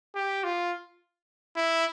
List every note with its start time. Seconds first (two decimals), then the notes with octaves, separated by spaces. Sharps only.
0.15 G4
0.44 F4
1.56 E4